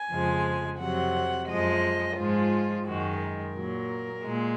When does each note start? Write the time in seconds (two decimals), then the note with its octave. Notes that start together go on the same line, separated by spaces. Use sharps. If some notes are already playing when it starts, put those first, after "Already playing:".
Already playing: G#5
0.09 F2 C#3 F3 G#3
0.79 F2 C3 F#3 F#5
1.48 F#2 F3 G#3 D#5
2.17 G#2 F3 G#3 F4
2.86 F#2 D#3 G#3 F#4
3.21 A#4
3.55 A#2 F#3
4.24 A#2 G#3